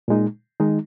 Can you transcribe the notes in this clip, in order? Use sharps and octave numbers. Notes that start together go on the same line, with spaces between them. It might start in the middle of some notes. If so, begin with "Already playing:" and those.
A#2 G#3 D#4
D#3 G#3 D#4